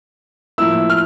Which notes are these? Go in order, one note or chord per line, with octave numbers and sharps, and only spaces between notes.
A2 F3 A#3 E4 E6
F6